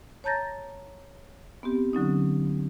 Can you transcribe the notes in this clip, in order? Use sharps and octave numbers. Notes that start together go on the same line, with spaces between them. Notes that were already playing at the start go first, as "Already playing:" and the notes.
C#5 A5 A#5 G6 A6 A#6
B3 C4 G4
D3 F#3 C#4 D#4